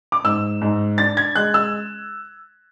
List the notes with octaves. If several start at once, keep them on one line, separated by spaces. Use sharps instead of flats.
D6
G#2 E6
G#2
D4 A6
G#6
G#3 F#6
E6